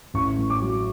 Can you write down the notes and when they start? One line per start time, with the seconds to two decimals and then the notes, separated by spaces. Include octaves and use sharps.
0.14 A1 C#6
0.37 A2
0.50 D6
0.61 F#3